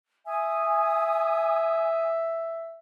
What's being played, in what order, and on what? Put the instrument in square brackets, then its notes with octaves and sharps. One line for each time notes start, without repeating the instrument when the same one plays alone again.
[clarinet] E5 [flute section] G#5 D#6